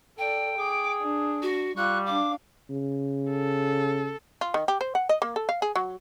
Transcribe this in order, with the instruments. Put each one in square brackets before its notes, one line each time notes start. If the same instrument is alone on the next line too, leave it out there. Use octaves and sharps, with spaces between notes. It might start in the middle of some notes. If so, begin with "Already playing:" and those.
[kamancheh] A4 D5 [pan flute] G5
[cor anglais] G#4 [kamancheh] D6
[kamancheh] D4
[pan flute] F#4
[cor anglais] G3 [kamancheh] F4 C#6 [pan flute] F#6
[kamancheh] D4 F5 [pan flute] D6
[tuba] C#3
[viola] A4
[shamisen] F4
D#3
G4
C5
F#5
D#5
A#3
A4
F5
G#4
F#3